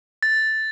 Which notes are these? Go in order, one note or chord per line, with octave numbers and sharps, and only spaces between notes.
A6